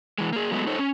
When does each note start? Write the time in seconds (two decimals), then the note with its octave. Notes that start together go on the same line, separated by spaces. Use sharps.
0.18 E3 G#3
0.33 A#3 G#4
0.52 F#3 G#3 A3 B3
0.67 D#4 A4 C5 C#5
0.79 C#4